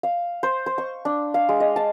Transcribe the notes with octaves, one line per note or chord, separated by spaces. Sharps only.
F5
C5
C5
C#6
D4
F5
G#3
D#5
A5